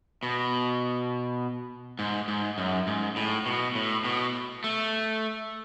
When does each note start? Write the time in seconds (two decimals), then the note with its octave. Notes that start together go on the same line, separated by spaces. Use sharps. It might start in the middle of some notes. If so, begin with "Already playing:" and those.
0.23 B2
1.99 G#2
2.28 G#2
2.58 F#2
2.87 G#2
3.16 A2
3.46 B2
3.75 A2
4.04 B2
4.64 A3